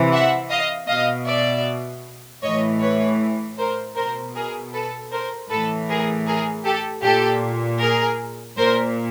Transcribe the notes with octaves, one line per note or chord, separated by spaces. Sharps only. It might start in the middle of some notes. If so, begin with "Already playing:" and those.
Already playing: C3 E3
E5 F#5
D#5 F5
B2 D#5 F5
D5 E5
A2 E3 C#5 D#5
B4 C#5
A#4 C5
B2 A#4 C5
G#4 A#4
A4 B4
A#4 C5
A2 E3 A4 B4
G#4 A#4
G#4 A#4
G4 A4
A#2 G4 A4
G#4 A#4
A#2 A#4 C5